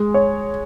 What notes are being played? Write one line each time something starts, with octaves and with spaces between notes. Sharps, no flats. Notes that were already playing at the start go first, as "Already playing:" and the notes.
Already playing: G#3
C#5